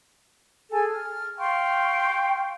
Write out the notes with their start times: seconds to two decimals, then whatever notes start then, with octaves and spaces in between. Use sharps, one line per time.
0.72 G#4 A4 G#5
0.89 F6
1.39 F5 G5 C6 C#6